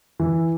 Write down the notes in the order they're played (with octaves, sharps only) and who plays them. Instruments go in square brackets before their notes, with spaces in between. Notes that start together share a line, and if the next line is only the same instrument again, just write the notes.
[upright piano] E3